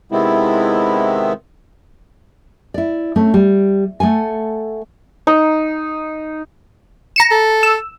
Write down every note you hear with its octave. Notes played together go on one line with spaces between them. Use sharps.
C3 D#3 G#3 B3 C4 E4
E4 D5
A3 C4 C#4
G3
A3 A4 F#5 G#5
D#4
A#5 C#7 E7
A4
E6